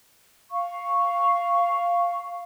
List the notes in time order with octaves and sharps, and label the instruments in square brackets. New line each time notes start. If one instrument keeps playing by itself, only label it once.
[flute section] F5 C#6